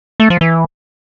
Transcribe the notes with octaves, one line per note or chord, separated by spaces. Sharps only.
A3
F3
E3